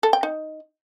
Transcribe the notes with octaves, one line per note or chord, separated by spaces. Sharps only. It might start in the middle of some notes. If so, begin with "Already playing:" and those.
A4
G5
D#4